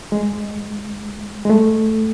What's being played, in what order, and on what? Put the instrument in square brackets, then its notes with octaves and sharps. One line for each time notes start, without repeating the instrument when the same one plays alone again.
[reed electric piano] G#3
G#3
A3